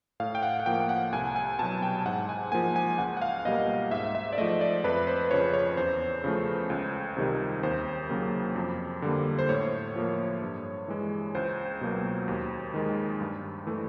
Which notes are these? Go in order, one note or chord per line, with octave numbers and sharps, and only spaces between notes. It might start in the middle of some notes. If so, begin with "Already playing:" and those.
A2 F5
G5
F#5
F#5
F3 A#3 G5
G5
F#5
C2 G#5
G#5
B2 F#3 A5
G5
G#2 F#5
G#5
F3 A#3 G#5
G#5
C#2 F#5
F#5
F5
B2 G3 A#3 D#5
G#2 E5
E5
D5
F3 A3 D#5
D5
F2 B4
C5
C#3 F3 C#5
C#5
E2 C5
C#3 F3 A3
C#2
C3 D#3 G3
D#2 C5
C#3 F#3 A#3
F2
D3 G3 A#3
C5
A2 C#5
F3 A#3
G2
E3 G#3
C#2 C5
B2 F#3 A#3
D#2
D#3 G#3
G2
E3 A3